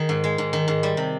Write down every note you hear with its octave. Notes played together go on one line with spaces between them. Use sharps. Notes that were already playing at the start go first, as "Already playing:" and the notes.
Already playing: D#3 G#4
G#2
G#3
G#2
D#3
G#2
G3
C3